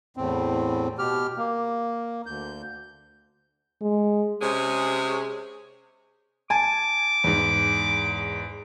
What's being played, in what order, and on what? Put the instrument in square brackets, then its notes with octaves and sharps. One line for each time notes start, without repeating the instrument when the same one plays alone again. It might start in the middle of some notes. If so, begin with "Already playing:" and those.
[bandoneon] E2 A2 C4
B2 G4 F6
A#3
D2 G6
[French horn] G#3
[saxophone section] C3 G#3 C#4 G#4
[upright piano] G#5 A5 [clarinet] D6
[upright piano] E2 G#2